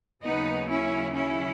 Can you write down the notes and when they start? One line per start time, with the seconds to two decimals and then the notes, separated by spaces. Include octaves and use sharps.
0.24 D#2 C#3 F#3 B3 D#4
0.69 C#4 E4
1.15 C#4 E4